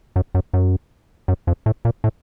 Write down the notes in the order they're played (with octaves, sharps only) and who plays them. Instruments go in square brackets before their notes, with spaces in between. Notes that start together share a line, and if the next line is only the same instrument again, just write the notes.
[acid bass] F#2
F#2
F#2
F#2
F2
A2
A#2
A2